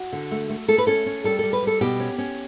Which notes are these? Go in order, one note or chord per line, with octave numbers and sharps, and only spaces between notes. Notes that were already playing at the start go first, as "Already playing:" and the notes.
Already playing: F#4
D3
A3
A3
A3 A4
B4
C#4 A4
C#4
G3 A4
G3 A4
B4
G3 A4
B2 G4
C#4
C#4